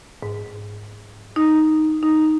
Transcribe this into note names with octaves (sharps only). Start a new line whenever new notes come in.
G#2
D#4
D#4